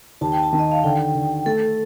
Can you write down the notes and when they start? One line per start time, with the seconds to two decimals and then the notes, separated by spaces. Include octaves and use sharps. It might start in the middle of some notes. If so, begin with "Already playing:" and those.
0.21 D#2 A5
0.32 G5
0.43 A5
0.53 D#3
0.59 D#5
0.72 F5
0.84 D3 G5
1.15 D3
1.46 A3 A4